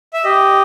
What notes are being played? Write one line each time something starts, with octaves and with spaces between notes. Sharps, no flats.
E5
G4 D#5